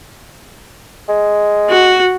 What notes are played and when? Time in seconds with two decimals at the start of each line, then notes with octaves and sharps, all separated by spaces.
1.09 G#3
1.70 F#4